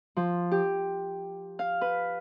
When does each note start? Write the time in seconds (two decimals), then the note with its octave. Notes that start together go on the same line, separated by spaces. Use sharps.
0.17 F3
0.51 G4
1.59 F5
1.81 B4